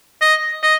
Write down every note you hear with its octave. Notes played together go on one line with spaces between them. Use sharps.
D#5
D#5